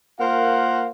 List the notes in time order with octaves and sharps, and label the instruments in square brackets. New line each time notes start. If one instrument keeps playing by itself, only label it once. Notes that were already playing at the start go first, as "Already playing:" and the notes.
[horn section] A#3 F4 A#4 C5 F5 F#5